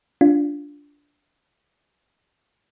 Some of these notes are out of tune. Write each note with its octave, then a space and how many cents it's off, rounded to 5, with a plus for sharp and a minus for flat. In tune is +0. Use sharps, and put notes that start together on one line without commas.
D4 -15 F4 +0